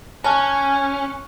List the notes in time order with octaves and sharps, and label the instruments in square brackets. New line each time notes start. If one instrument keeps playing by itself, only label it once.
[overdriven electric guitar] C#4 [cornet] G#5 [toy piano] A5 [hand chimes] C#6 F6 F#6